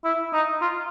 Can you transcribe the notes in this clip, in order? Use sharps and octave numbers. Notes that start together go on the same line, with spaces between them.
E4
D#4
F4